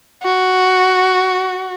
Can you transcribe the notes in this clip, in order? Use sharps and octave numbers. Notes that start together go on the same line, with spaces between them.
F#4